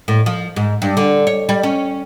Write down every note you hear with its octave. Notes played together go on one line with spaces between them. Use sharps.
A2
F3
G#2
G2
D3
C#5
G3
C#4